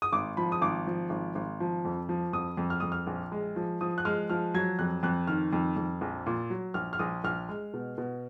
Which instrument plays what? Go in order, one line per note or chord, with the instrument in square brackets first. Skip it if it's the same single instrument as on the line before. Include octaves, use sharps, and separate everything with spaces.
[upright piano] D#6
G#1 D6
F3 B5
D#6
G#1 D6
F3
G#1
G#1
F3
F2
F3
F2 D#6
F2
F6
F2 D#6
F6
A#1
G#3
F3
F3 D#6
F#6
G#3 F6
F3 F6
F#3 G#6
F2 F#6
F2 F#6
D#3 F6
F2
F2
A#1
A#2
F#3
A#1 F6
F6
A#1 D#6
A#1 F6
G#3
B2
B2